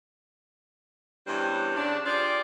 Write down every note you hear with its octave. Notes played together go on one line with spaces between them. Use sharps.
E2 G2 G3 C#4 E4 C5
C#3 D4
F4 G4 G#4 C5 D5